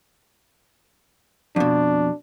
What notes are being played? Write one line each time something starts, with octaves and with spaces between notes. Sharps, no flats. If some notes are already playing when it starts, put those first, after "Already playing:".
F2 B2 D4